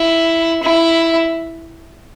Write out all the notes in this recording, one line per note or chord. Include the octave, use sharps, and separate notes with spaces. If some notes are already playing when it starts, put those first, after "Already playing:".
Already playing: E4
E4